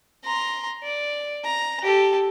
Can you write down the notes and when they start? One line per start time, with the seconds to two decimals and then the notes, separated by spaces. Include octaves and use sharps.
0.25 A#5 C6
0.83 D5
1.44 A#5
1.82 G4 A4